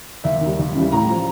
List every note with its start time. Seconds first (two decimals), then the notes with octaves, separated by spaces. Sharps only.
0.24 D#2 E5
0.41 D#3
0.46 G3
0.59 D#2
0.75 C#3 E3 G3
0.92 A2 A#5
1.09 F3